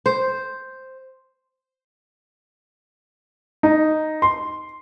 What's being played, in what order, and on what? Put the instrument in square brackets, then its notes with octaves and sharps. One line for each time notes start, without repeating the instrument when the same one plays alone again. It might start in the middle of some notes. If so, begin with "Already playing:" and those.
[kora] C5
[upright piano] D#4
C6